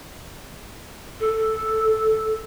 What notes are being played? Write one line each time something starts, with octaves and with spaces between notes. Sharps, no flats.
A4